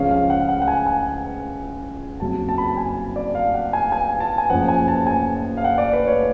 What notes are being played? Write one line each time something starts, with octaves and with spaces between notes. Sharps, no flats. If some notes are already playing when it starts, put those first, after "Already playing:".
Already playing: C#2 C#3 F3 G#3 C#4 F5
F5
F#5
F#5
F#5
G#5
G#5
F#1 F2 C#3 F#3 A5
A5
B5
A5
G#5
D5
F5
F#5
G#5
G#5
A5
G#5
F#1 F#2 F3 F#5
G#5
A5
G#5
F5
F#5
D5
B4
C#5